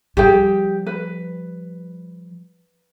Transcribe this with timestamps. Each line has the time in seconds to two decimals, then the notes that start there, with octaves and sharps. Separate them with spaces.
0.17 F3 G3 G4 G#4 G5
0.86 B4